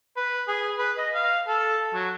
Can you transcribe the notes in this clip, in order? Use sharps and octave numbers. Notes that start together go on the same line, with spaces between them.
B4
G#4
B4
D#5
F5
A4
F#3